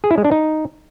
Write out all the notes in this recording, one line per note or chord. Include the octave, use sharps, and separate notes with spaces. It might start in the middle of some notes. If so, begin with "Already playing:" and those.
G#4
E4
G#3
D4
D#4